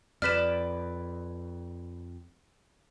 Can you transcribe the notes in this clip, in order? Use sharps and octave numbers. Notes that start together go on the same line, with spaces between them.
F2 B4 D5 F6 B6 E7